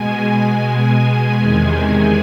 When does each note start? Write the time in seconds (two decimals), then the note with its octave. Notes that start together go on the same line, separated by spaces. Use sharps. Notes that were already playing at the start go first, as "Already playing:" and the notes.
Already playing: B2 G#3 G#5
0.58 G#5
1.37 E2 C3 D#3 G#3 G#5